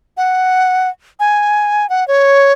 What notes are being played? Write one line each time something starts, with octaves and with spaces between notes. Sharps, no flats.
F#5
G#5
F#5
C#5